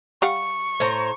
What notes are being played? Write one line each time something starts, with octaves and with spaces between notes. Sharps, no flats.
G3 F5 F#5 C#6
A2 C5 A#5